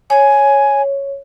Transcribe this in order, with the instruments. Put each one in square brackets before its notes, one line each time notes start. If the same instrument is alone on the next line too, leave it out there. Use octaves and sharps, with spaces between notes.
[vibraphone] C#5 [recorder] G#5